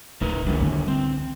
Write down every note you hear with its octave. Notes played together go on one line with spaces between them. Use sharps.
D1 D#4 A#4 B4
C#2 D#3 F3 G3 D4
D3 E3
C4